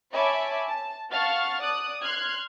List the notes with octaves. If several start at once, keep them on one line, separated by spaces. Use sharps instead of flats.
C#5 E5 G#5 A5 B5 D6
A5
F5 F#5 A5 C#6 F6 A6
D5 D#6 F#6
C6 F6 F#6 G#6